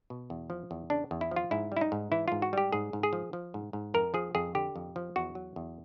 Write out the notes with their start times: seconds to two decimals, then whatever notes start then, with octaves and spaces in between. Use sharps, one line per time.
0.10 B2
0.30 E2
0.50 F3
0.71 E2
0.90 C#3 D4
1.11 E2
1.21 E4
1.31 F3
1.36 F4
1.51 G#2 E4
1.72 G3 E4
1.81 D#4
1.92 G#2
2.12 E3 E4
2.28 G#2 F4
2.42 F#4
2.53 G3 G4
2.72 G#2 G#4
2.93 G#2
3.03 G#4
3.13 F3
3.33 F3
3.54 G#2
3.73 G#2
3.94 F2 A#4
4.14 F3 G#4
4.35 F2 G#4
4.55 D3 G4
4.76 F2
4.96 F3
5.16 E2 F#4
5.35 F#3
5.56 E2